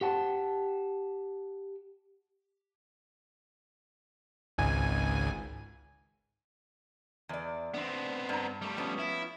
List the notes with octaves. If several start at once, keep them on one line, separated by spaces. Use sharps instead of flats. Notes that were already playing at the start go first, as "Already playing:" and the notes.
G4 F#5 A5
G#1 C#2 G#5
E2 D5
B3 C4 D4
G2 A#5
G3 A3
F3 B3 C#4
E4